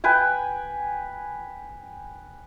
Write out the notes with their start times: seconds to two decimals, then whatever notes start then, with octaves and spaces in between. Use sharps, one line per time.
0.04 B4 G5 G#5